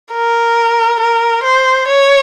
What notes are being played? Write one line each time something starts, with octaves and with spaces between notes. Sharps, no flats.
A#4
A#4
C5
C#5